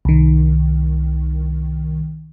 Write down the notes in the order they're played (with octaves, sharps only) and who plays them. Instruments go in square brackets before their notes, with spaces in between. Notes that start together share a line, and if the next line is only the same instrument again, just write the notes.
[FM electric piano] C2 D#3